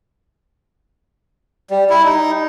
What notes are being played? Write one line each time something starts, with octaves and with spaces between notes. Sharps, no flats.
G3
E4
D#4